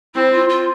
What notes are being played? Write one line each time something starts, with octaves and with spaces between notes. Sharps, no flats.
C4 E4
F4
F4